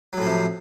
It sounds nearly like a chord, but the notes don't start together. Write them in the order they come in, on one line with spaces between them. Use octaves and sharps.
F#3 A2 F3 C3